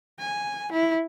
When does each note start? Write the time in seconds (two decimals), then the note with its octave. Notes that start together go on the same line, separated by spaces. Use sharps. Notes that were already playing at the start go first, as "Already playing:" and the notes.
0.20 G#5
0.72 E4